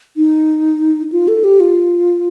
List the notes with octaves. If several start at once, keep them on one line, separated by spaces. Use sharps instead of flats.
D#4
F4
A4
G4
F4